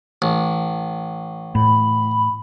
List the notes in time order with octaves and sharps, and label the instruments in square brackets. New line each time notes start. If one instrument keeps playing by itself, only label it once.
[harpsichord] A1
[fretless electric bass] A2 [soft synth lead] B5